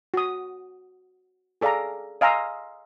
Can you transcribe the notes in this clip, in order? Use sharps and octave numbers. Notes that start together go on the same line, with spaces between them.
F#4 D#6
G#4 A4 D5 F5 G#5 A#5
D#5 F5 G#5 A#5 C6 E6